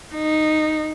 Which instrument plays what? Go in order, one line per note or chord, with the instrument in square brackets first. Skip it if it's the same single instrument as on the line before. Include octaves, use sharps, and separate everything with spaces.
[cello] D#4